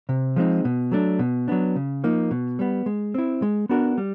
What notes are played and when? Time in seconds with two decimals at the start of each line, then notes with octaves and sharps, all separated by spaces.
0.09 C3
0.36 F3 G#3 C4 D#4
0.65 B2
0.92 F#3 A3 D4
1.19 B2
1.48 F#3 B3 D4
1.76 C#3
2.04 F3 A#3 D#4
2.31 B2
2.59 G3 B3
2.86 G#3
3.14 C4 E4
3.42 G#3
3.69 B3 D4 F#4 A#4
3.98 G3